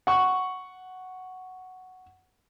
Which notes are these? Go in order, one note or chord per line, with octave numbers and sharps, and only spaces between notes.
F#5 C#6